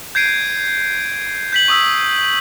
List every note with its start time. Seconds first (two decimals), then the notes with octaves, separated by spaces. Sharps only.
0.15 G6 G#6 C7 D7 D#7
1.53 G6 B6 F#7
1.68 C#6 D#6 E6 B6